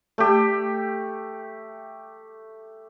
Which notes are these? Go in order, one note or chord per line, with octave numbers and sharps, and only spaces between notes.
A3 G4